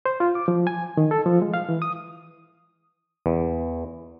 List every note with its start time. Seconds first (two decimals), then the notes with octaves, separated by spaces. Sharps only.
0.06 C5
0.20 F4
0.35 D6
0.48 F3
0.67 G#5
0.97 D#3
1.11 A4
1.26 F3
1.42 G#3
1.54 F5
1.69 E3
1.82 D#6
3.26 E2